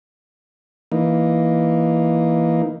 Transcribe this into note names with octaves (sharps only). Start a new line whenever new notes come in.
E3 A#3 D#4